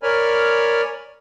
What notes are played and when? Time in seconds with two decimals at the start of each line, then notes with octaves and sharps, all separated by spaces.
0.03 A#4 C#5 D5 G#5 B5 F6